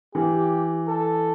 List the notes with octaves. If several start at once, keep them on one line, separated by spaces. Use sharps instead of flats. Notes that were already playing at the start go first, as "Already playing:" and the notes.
E3 G4
A4